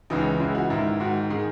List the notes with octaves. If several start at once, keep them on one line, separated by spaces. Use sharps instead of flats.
C#2 C#3 E3 D#4
C#2 C#3 E3 E4
F#4
G#2 D#3 E4
G#2 D#3 F#4
D#3 G#4